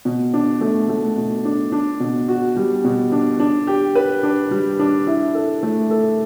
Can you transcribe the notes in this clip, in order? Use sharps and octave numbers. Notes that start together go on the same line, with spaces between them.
B2
D4
A3
A3
B2
D4
D4
B2
F#4
G3
B2
D4
D4
G4
B4
D4
G3
D4
E4
A4
A3
A4